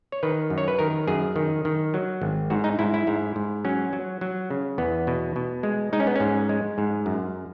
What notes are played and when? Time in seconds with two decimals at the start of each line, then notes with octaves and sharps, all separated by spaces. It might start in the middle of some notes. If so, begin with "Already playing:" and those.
0.12 C#5
0.23 D#3 B4
0.50 F#2
0.58 C#5
0.68 B4
0.79 D#3 A#4
1.07 F#2 G#4
1.36 D#3
1.65 D#3
1.94 F#3
2.22 G#1
2.50 G#2 F#4
2.64 D#4
2.79 G#2 E4
2.94 E4
3.07 G#2
3.36 G#2
3.65 F#3 C#4
3.93 F#3
4.21 F#3
4.50 C#3
4.78 E2 B3
5.07 B2
5.36 B2
5.63 G#3
5.93 G#3 D#4
6.00 C#4
6.07 B3
6.16 G#2 C#4
6.49 G#3
6.78 G#2
7.06 F#2